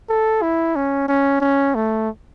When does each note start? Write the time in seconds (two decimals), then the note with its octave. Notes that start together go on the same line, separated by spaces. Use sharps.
0.09 A4
0.42 E4
0.76 C#4
1.08 C#4
1.40 C#4
1.75 A3